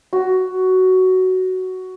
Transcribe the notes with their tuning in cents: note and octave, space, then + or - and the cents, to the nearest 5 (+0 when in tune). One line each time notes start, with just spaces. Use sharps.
F#4 +10